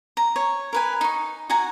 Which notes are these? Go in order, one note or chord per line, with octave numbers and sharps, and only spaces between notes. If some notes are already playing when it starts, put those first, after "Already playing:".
A#5
C#5
A#4 B4 G#5
D#4 C#6
F#4 F#5 G#5 A#5